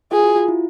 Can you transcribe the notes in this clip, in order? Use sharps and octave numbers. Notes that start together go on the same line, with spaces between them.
F4 G#4
F#4
F4
E4